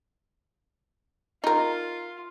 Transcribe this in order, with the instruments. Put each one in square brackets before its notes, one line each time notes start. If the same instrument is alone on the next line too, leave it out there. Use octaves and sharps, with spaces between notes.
[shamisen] D#4 A#4 [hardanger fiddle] F4